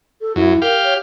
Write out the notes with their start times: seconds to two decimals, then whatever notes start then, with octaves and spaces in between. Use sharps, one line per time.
0.21 A4
0.36 F#2 E4
0.62 G4 A#4 F5
0.84 C#5